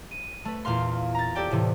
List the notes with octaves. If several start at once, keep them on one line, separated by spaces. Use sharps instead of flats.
D#7
A3 B4
E2 A#2 F5 C6
A#5 A6
G4 A4 D5 G5
E2 A2 C3 E3